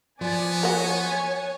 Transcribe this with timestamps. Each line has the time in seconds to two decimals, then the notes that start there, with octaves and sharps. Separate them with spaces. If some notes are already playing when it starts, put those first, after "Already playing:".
0.21 F3 B3 D5 G#5
0.63 F#4 A#4 C#5 G#5